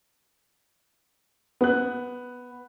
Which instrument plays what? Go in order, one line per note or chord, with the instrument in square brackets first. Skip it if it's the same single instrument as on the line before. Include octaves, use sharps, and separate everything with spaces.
[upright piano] B3 F#6